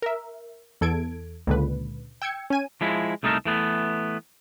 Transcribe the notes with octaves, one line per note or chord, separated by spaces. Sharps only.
A#4 E5
E2 A4 G#6 D7
C#2 A#2 D3 B4
G5 E6 G#6 C#7
C#4 G#5 D#7
F3 G#3 E4
C2 A3 D#4 G4 A4 A#4
E3 A3 B3